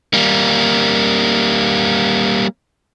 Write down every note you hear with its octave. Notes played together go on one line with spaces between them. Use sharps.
G3 A#3